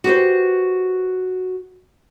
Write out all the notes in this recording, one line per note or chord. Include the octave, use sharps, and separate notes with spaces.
F#4 G4 B4 C5